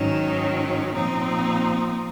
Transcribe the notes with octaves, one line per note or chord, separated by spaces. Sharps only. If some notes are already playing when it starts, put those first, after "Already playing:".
Already playing: G#2 D#3 F#3 C#4
A#2 F3 C4 D#4